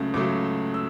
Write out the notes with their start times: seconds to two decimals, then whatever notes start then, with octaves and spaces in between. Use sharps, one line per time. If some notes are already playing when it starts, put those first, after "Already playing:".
Already playing: C#2 C#3 F#3 A3
0.14 C#2 C#3 F#3 A3 D6
0.74 E6